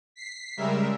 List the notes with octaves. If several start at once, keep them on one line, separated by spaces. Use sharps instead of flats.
B6 C7
C#3 G3 G#3 A#4 E5